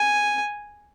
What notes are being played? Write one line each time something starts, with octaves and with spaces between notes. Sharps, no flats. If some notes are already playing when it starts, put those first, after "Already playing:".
Already playing: G#5